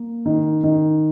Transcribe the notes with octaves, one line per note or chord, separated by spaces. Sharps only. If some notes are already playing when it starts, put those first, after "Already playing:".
Already playing: A#3
D#3
D#3